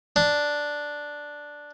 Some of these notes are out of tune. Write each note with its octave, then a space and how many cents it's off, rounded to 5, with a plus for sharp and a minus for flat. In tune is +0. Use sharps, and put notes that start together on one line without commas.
D4 +0